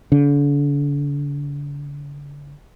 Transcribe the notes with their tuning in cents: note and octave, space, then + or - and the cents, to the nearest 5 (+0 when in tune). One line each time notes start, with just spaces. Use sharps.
D3 -40